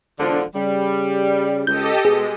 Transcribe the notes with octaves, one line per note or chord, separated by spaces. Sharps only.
E1 D3 F3
C#3 G3
C#2 G4 A4 D#5 G6
B2 G#3 G#4